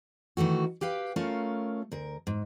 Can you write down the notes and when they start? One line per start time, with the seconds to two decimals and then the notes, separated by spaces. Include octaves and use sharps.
0.37 D#3 E3 A3 F#4
0.81 G4 B4 F5 G5
1.16 A3 C#4 F4 A#4 F5
1.92 D2 A#4
2.27 G#2